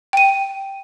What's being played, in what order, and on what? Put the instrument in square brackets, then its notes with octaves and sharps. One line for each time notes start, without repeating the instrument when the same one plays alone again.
[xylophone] G5 D#7